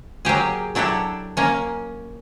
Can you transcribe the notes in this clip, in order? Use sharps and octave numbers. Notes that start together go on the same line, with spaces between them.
F#3 A#3 G4 G#4
F#3 D4 E4 G4 A4
A#3 C#4